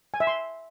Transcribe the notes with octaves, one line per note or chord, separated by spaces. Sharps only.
G#5
E5
C6